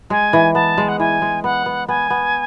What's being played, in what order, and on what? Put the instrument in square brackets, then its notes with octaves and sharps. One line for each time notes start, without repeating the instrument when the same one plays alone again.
[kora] G#3 [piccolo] G#5
[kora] E3
[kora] B3 [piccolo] A5
[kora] G#3
[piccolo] F#5
[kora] E3 [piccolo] G#5
[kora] G#3
[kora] B3 [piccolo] F#5
[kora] B3
[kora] B3 [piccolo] G#5
[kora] B3